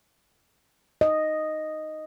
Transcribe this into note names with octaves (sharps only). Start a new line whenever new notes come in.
D#5